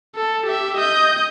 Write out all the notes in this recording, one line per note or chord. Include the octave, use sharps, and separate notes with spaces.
A4
G4 E5
D#5 G6